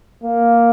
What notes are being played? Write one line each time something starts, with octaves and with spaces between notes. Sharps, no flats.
A#3